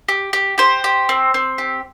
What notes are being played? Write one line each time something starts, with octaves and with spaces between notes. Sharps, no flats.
G4
G4
G4 C5
G4
C4
C4
G4